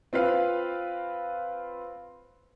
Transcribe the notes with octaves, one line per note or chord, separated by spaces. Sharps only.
C4 F4 B4 F5